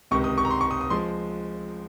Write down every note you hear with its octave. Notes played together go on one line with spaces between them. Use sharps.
C#2 C3 D#3 C#6
D#6
C#6
A#5
C6
C#6
D#6
D#6
F3 G#3 C6